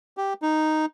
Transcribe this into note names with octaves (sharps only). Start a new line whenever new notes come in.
G4
D#4